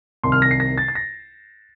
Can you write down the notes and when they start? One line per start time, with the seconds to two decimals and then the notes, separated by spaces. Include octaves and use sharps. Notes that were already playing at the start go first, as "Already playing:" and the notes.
0.24 C2 C3 D#3 C6
0.32 F6
0.42 A#6
0.51 C7
0.60 A#6
0.78 A6
0.88 A6
0.95 A#6